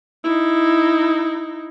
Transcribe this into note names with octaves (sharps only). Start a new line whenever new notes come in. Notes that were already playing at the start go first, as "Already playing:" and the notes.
D#4 E4